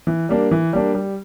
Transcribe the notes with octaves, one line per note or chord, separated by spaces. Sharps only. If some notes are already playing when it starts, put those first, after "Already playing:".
E3
G3 A#3 D4
E3
G3 A#3 D4
G3